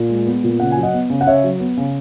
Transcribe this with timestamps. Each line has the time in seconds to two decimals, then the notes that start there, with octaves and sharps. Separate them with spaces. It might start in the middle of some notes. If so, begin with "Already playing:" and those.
Already playing: A#2
0.09 G#3
0.26 B3
0.44 A#2
0.60 C#3 F#5
0.71 F#3 G#5
0.83 D#5 F#5
0.93 B3
1.10 C#3
1.21 F#5
1.27 C#3 C#5 E5
1.43 F#3
1.60 B3
1.77 C#3